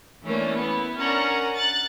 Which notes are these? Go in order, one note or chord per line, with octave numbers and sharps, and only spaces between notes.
E3 A3 A#3 C#4 D4
B3 E4
C#4 D4 A#4 F#5 A#5
F#6 A6